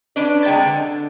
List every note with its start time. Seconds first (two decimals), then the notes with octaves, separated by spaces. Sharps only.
0.16 C#4 D4 B4 D5
0.45 C3 G#3 G5 A5
0.62 D3